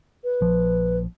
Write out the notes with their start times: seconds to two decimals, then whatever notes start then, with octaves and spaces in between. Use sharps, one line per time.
0.24 B4
0.41 A#1 F3